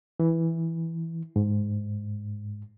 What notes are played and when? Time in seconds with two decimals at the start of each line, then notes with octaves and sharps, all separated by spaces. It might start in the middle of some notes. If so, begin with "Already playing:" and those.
0.20 E3
1.36 G#2